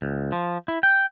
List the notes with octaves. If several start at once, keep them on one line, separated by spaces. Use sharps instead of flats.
C#2
F3
E4
G5